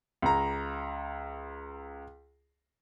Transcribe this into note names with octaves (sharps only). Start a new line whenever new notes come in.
C#2 A#5